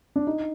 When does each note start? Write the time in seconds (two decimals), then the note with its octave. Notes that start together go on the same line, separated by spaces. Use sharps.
0.16 D4
0.27 D#4